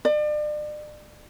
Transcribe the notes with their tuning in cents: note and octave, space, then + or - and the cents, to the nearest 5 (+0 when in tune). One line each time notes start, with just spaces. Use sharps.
D5 +35